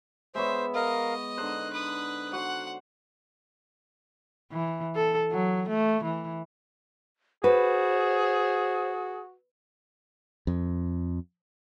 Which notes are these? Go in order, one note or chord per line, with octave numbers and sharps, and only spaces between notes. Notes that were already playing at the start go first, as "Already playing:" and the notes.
G#3 B3 C5 C#5 E5
A#4 D#5 F5
D3 D#4 C5 F#6
B4 D#6
F#4 C5 F#5
E3
A4
F#3
A3
E3
F#4 G#4 B4 C5
F2